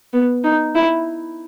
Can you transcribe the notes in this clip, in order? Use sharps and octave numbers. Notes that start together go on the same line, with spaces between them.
B3
D#4
E4